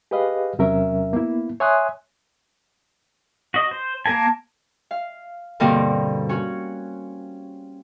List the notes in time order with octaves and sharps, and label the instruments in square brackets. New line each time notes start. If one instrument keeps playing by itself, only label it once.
[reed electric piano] G4 G#4 B4 D#5 F5
E2 C3 F#3 C#4 A#4 E5
A#3 B3 E4
C#5 E5 G#5 C6 D#6 F#6
[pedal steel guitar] F#4 D#5
C5
[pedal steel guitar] A#3 A#4 G#5 [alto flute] A5
[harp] F5
G2 B2 D3 A#3 C4 A#4
C#4 F#4